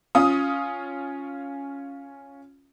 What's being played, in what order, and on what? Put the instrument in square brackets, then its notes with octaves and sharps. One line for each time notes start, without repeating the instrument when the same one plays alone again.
[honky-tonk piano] C#4 F4 D#6